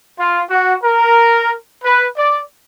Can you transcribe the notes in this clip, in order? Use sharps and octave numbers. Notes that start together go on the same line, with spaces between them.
F4
F#4
A#4
B4
D5